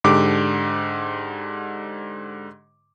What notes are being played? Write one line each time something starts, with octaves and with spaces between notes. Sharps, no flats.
G#2 D3 G4 D6